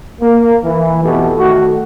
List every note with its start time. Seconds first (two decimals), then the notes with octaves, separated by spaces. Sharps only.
0.20 A#3
0.63 E3
1.02 F2 B2 E3 A3 G4 A4
1.36 D#3 A3 F#4